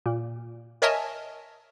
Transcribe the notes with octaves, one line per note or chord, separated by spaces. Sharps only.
A#2
A#4 C#5 D#5 E5 G#5 A5